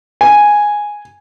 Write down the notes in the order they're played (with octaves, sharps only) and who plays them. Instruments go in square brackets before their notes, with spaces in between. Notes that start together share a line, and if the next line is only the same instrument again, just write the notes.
[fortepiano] G#5